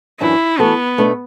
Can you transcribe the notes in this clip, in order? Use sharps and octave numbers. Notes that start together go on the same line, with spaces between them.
F#2 E3 D4 E4 F#4
E3 A3 B3 F#4 A4
B2 A3 D4 B4